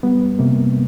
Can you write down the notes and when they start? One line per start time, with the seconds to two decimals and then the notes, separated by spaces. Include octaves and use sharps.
0.03 G3 B3
0.39 C3 A#3